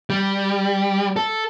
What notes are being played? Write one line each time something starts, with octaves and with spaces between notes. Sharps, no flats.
G3
A4